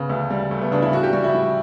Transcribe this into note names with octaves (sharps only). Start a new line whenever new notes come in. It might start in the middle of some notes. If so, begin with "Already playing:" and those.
Already playing: C#3 B3
D2
G3
D2 A3
B3
C#3 D4
E4
A2 F#4
G4
G3 F#4
E4
A2